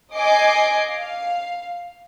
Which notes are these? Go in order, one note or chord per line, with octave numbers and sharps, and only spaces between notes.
D#5 G#5 D6 C7
F5